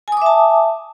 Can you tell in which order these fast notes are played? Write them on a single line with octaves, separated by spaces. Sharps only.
G#5 D#6 D6 E5 A5